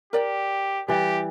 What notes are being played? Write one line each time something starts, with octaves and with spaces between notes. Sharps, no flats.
G4 A#4 D5 G5
E3 G3 G4